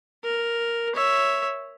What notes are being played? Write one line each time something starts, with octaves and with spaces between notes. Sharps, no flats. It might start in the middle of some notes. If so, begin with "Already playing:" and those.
A#4
C#5 E5